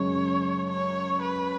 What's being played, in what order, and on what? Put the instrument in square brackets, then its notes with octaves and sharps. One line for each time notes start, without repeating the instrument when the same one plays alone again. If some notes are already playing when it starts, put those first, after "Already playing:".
Already playing: [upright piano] F#2 C#3 G#3 [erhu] C#5
[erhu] C#5
B4